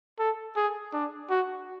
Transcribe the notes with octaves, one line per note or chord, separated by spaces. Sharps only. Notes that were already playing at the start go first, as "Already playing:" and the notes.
A4
G#4
D4
F#4